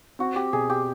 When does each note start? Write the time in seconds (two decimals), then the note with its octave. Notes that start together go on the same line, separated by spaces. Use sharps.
0.19 C4 F#4
0.36 G4
0.53 B2 G#4
0.70 G4